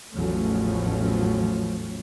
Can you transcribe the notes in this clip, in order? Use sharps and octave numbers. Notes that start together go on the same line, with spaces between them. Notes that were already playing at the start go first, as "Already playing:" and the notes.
A1 E2 F3 F#3 A3 C#4